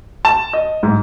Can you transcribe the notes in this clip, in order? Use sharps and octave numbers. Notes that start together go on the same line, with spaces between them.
A5
D#5
G#2